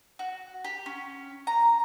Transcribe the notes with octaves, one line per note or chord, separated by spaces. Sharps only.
F#4
G4
C#4
A#5